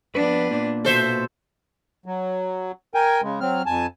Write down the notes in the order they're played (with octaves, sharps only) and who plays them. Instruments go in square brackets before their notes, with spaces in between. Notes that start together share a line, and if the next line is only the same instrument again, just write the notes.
[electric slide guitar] F2 B4 [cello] B3 D4
[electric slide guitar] A#2
[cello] B2 [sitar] A4 C5 E5
[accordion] F#3
A#4 G5 G#5
C#3 G#3
F#3 C4 F6
F2 G#5 A5